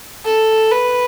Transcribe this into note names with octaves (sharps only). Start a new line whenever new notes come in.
A4
B4